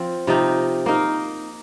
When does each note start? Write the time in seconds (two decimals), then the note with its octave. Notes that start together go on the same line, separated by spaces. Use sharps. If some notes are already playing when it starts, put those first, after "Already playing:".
Already playing: F3 C4
0.27 C3 F3 D#4 G4
0.86 A#3 D#4 A#4